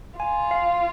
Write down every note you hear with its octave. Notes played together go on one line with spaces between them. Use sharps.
F4 G#5
F5